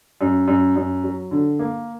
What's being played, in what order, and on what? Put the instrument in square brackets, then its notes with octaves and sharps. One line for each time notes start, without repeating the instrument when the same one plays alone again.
[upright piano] F#2
F#2
F#2
F#3
D3
A#3